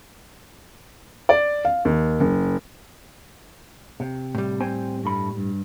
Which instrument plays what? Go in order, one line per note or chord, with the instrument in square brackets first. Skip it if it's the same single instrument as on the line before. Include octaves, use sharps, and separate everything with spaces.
[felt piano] D5
F5
D#2
F#1
[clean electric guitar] C3
[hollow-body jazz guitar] A2 G3
[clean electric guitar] C4 C5 G#5
G2 A3 B5
G2